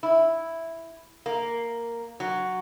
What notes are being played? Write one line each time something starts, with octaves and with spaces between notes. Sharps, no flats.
E4
A#3
F#3